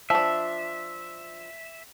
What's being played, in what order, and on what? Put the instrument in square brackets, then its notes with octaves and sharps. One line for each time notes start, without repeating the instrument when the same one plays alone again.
[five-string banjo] F3 D4 [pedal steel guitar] E5